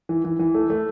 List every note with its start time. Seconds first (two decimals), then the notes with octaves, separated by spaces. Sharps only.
0.09 E3
0.24 E3
0.39 E3
0.54 A3
0.70 A3